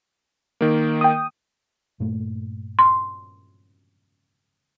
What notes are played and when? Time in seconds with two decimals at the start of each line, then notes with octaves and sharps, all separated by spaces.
0.61 D#3 A#3
1.01 G5 D#6
2.00 G2 A#2 A3
2.79 C6